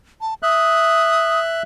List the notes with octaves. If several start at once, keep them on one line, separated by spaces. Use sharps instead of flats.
A5
E5 D#6 F#6